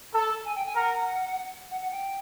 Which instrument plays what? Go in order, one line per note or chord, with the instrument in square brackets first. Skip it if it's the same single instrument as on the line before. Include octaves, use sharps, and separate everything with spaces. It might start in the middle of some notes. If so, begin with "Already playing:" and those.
[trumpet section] A4
[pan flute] G#5
G5
G#5
[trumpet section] A#4 [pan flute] F#5
[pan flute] F#5
F#5
G5